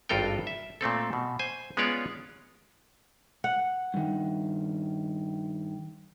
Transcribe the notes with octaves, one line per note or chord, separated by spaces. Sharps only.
G#1 G2 F4 A4 A#4 G5
E5
A#2 A3 C4 A4
B2
C5 G#5
G#3 B3 C#4 F4 C#5 D5
F#5
G2 D#3